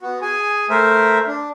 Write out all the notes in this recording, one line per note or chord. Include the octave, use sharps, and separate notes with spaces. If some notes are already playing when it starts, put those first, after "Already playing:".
B3 F#4
G#4 G#5
A3 A#4 C5 E5
D4